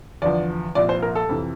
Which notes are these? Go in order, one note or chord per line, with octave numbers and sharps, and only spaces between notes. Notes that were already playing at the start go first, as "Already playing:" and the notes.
E2 D3 F3 D5
C2 A#2 F3 D5
C5
A#4
A4
F2 C3 E3